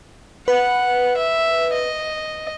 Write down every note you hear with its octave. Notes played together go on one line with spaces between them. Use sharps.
B4 F#5
E5
D#5